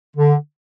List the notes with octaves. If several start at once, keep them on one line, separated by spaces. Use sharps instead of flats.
D3